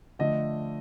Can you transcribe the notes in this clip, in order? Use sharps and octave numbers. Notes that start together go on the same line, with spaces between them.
D3 F3 A3 D#5